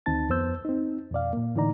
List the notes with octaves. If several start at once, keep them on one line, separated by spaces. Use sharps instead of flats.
D2 D#3 C4 D#4 A5 A6
F2 B3 C5 E6 G6
C4 D#4
F2 B2 D5 F5
A#2 A#3
A2 D3 E3 D#4 D5 A#5